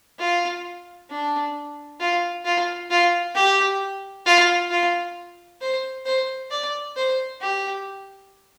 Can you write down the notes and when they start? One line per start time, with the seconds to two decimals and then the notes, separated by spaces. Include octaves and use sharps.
0.19 F4
1.10 D4
2.00 F4
2.45 F4
2.90 F4
3.35 G4
4.26 F4
4.70 F4
5.61 C5
6.05 C5
6.51 D5
6.96 C5
7.41 G4